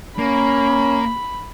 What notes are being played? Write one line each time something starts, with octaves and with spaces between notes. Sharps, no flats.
A#3 C#4 B5